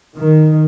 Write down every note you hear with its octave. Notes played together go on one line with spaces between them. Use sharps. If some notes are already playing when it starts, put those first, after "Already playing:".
D#3